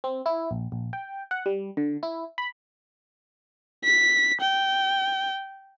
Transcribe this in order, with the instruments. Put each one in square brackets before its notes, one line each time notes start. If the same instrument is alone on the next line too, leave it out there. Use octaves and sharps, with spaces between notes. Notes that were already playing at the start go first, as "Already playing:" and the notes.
[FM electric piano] C4
E4
A#1
A#1
G5
F#5
G3
D3
E4
B5
[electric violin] B6
G5